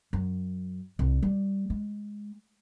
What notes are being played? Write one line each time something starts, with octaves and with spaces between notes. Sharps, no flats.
F#2
C2
G3
G#3